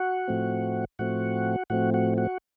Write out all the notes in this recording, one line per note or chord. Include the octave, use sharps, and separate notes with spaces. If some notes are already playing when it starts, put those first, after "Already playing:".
Already playing: F#4 F#5
A2 F3 A3 C4
A2 F3 A3 C4 F#4 F#5
A2 F3 A3 C4 F#4 F#5
F#4 F#5
F#4 F#5